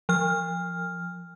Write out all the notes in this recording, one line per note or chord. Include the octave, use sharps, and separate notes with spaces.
F3 F6